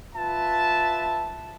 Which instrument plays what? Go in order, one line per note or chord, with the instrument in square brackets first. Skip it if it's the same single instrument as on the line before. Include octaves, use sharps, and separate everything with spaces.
[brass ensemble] F4 B4 E5 A5